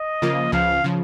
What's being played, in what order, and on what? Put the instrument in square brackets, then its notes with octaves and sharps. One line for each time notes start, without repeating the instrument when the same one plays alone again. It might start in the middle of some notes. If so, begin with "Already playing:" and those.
Already playing: [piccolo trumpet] D#5
[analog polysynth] C#3 F3 A#3 F4
[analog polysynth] C#2 C#3 F3 [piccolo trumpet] F5
[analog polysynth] C#3 F3